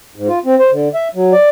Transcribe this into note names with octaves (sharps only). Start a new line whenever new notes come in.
G#2
F4
C4
C5
D3
E5
F#3
D5